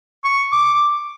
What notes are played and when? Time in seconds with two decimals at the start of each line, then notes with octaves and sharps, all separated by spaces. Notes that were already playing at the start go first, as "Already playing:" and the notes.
0.24 C#6
0.53 D6